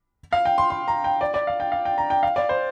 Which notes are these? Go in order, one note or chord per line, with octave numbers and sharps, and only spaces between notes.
F5
G5
C6
C6
A#5
G5
D5
D5
F5
G5
F5
G5
A#5
G5
F5
D5
C5